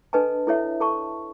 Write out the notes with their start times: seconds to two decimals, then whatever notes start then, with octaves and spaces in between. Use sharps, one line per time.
0.13 D4 A4 B4 D#5 G#5 A5
0.47 E4 A4 C#5 E5
0.81 A4 A5 C#6